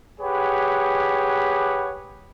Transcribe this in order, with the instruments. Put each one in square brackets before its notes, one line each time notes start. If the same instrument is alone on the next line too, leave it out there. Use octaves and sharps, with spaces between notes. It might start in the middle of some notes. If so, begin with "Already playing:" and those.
[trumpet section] G4 G#4 B4 C#5 F#5